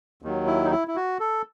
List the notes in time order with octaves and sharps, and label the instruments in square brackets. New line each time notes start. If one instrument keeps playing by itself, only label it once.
[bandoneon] D#2 D#3 F#3
E4
D#4
E4
E4
F#4
A4